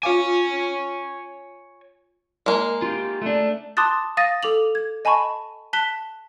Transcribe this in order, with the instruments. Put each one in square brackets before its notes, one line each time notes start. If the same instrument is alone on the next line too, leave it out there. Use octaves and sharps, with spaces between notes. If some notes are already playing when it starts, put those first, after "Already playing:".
[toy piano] F4 F5 D6 [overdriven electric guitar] C#5 G#5
[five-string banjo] G#3 A#3
[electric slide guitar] F4 G4
A3 D4
[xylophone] A5 C6 D6 D#6 F#6 A6
F5 D#6 A6 A#6 D#7
A4 D6 F7 F#7
G#6
D#5 G#5 A5 B5 C#6
A5 F#6 B6 G7